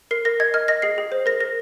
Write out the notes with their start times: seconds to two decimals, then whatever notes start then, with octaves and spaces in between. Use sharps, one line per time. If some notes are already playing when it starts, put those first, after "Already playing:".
0.11 A#4 C7
0.25 A#4 A#6
0.40 D#5 G#6
0.54 D#5 F6
0.68 D#5 A#6
0.82 G#4 C7
0.98 G#4
1.12 C5
1.26 A#4 A#6
1.40 A#4 A#6